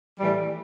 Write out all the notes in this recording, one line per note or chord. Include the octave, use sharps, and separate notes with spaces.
A2 E3 G3